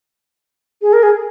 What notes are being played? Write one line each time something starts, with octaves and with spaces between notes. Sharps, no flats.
G#4
A#4
G#4